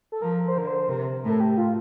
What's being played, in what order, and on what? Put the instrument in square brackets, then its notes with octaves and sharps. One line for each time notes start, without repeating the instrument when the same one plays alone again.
[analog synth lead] A4
[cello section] F3 [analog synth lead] A#4
[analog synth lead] C5
[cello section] D3 [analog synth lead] A#4
[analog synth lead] C5
[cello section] C3 [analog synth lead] A#4
[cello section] A2
[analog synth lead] A4
G4
F4